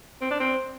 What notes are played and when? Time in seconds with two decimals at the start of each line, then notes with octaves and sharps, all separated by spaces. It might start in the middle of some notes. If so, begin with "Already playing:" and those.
0.21 C4
0.31 D4
0.40 C4